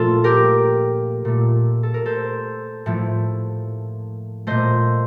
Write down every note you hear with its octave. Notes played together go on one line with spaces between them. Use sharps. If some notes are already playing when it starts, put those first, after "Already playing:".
Already playing: A#2 F3 A3 F4 A4
G4 A#4
A#2 A3
A4
A#4
A4 C5
A2 F3 A3
A#2 A3 C5 D#5